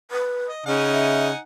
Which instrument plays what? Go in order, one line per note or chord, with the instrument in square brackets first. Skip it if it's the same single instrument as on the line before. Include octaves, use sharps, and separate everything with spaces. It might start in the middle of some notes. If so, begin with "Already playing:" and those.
[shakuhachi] B4
[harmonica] D#5
[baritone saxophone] C#3 [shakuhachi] C#4 [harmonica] D#4 F#5 G#5
[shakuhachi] E5